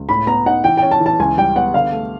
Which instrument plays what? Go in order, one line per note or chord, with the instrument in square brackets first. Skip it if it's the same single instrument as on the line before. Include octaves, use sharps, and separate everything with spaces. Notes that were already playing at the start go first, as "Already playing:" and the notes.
Already playing: [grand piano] C#2
[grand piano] A2 [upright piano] B5
[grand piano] B3 [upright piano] A#5
[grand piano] D#4 [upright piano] F#5
[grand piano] E3 [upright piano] G5
[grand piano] C#4 [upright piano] G5
[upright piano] A5
[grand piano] E3
[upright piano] A5
[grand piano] C#2 [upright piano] G#5
[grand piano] G3 [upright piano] G5
[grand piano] B3 [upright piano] F#5
[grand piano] D3 [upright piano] F5
[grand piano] A3